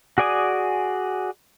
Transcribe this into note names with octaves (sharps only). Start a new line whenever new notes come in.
F#4 G#4 D5 G#5 D#6